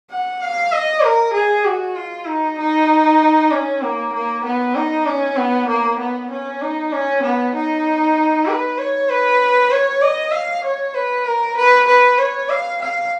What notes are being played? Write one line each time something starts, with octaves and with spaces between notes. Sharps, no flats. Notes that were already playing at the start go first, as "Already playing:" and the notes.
F#5
F5
D#5
A#4
G#4
F#4
F4
D#4
D#4
C#4
A#3
A#3
B3
D#4
C#4
B3
A#3
B3
C#4
D#4
C#4
B3
D#4
B4
C#5
B4
C#5
D#5
F5
C#5
B4
A#4
B4
B4
C#5
F5
F5